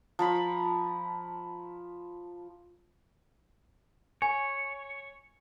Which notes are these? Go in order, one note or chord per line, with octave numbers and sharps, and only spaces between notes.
F3 A#5 B5
C#5 G#5